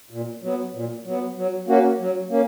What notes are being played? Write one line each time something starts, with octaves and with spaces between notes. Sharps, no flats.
A#2
F#3 B3
A#2
F#3 B3
F#3
A#3 C#4 F#4
F#3
A#3 C#4